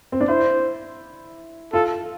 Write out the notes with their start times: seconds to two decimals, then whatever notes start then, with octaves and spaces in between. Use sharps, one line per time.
0.12 C4
0.21 D4
0.28 E4 C5
1.73 F4 A4